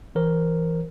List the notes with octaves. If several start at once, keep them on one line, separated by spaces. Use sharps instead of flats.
E3 A#4 C5